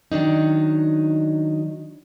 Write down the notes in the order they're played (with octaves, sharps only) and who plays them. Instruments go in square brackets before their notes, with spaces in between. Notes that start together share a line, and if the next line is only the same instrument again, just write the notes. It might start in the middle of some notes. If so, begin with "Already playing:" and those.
[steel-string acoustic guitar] D#3 F#3 D4 D#4